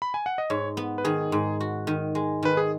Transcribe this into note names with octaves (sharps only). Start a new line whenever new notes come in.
B5
G#5
F#5
D#5
G#2 C#5
B3
B4
D#3 G#4
G#2
F#4
D#3
G#3
D#3 B4
G#4